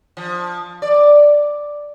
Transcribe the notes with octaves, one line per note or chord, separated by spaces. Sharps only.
F3
D5